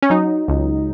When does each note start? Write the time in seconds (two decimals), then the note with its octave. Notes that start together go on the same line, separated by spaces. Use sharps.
0.02 C#4
0.10 F#3 D#4
0.48 C#2